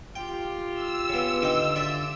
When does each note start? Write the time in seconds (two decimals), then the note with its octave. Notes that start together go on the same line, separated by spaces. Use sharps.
0.16 F4 G4 G5
0.73 E6
1.09 C#3 B3
1.43 D3 D#4 G5
1.76 F4 D5 E5